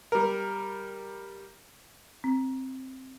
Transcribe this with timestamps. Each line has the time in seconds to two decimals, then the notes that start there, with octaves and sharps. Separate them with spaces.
0.12 G3 A#4
2.24 C4